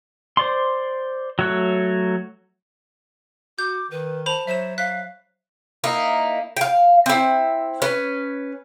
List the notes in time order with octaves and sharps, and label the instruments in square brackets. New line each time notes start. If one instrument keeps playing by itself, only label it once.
[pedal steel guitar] C5 D5 C6
F#3 A3 C#5 F#6
[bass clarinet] F#4 [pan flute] D6 [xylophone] G6
[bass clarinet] D#3 [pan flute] B4
[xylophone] C5 B5 F7 [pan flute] A5
[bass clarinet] F#3 [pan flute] C5 [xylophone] E5 E7
[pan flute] F5 [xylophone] F#6 B6
[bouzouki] A#3 D#4 E4
F5 G5
C4 E4
C#4 B4